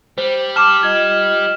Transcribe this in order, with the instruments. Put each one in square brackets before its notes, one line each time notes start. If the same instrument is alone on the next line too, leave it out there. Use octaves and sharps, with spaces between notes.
[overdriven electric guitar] G3 [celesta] C5
[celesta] A5 D6 [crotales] F6 E7
[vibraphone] F4 D#5 [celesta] G#6